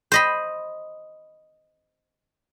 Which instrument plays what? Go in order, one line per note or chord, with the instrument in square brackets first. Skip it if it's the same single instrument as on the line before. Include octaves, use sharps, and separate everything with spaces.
[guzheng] C5 D#5 B5